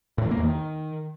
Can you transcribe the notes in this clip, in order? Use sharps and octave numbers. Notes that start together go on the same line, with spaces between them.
A2
E3
A#3
E2
D#3